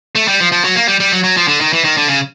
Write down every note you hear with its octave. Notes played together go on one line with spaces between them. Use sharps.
A3
G3
F3
F3
F#3
A#3
G3
G3
F#3
F#3
F3
D3
D#3
E3
D#3
D3
C#3